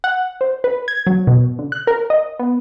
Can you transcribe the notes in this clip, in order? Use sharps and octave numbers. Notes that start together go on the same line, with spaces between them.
F#5
C5
B4
G#6
F#3
B2
D3
F#6
A#4
D#5
B3